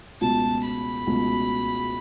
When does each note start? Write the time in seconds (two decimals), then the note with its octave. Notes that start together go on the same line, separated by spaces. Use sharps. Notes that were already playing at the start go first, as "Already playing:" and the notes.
0.21 C#2 B2 A3 F#4 A5
0.64 B5
1.07 C#2 B2 A3 F#4